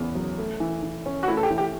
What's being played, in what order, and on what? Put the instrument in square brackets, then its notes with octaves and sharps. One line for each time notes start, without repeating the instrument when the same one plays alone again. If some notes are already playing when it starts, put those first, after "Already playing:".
Already playing: [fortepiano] E2 C#3 B3
F#3
A3
E3
E3
C#4
[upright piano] F#4
[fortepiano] A3 [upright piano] E4
[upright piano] A4
G4
[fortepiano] E3
[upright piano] G4